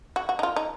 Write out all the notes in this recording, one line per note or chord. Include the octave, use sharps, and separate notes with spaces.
F#4
F#4
D#4
F4
D#4